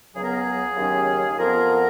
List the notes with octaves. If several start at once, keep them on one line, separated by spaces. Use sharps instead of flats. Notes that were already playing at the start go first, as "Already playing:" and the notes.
C#2 C#3 F#3 B3 G#4
A#4
G#4
D#2 C#3 F#3 C#4
F2 F3 B3 A#4